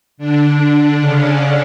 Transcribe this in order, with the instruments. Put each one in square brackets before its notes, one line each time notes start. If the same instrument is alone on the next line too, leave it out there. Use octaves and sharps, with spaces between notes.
[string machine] D3 D4
C#3 C#4